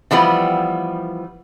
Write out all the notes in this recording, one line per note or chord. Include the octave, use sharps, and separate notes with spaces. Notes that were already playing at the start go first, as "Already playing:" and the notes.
E3 F3 G3 B3